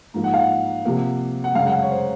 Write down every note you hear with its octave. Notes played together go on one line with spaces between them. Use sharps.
G#2 F3 A#3
F#5
F5
F#5
C3 F3 A#3
F#5
F#2 C#3 G#3 F5
F#5
F5
C#5
C5